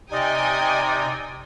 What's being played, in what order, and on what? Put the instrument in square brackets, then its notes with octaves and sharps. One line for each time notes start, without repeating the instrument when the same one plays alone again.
[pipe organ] C3 D#4 [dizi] D5 [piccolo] D#5 [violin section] G5 G#5 D#6